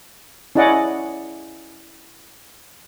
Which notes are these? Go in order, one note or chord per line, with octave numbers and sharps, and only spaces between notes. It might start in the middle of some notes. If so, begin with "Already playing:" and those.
C#4 E4 D5 D#5 F#5